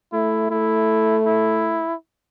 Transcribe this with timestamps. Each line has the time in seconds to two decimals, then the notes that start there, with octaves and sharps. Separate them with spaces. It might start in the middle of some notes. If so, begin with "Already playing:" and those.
0.13 A3 E4
0.50 A3 E4
1.26 E4